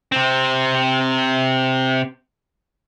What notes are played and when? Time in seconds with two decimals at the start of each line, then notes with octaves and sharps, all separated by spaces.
0.12 C3 C4